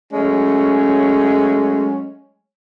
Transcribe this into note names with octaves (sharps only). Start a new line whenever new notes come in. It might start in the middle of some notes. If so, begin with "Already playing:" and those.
F#3 G#3 A3 C#4